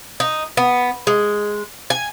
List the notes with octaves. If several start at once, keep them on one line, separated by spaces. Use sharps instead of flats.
D#4
B3
G#3
G#5